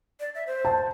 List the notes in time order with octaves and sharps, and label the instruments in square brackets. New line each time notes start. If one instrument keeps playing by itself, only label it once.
[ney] D5
E5
C5
[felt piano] A5